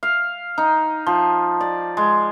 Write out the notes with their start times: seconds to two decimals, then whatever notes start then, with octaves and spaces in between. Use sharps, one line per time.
0.03 F5
0.58 D#4
1.07 F3
1.61 D5
1.97 G#3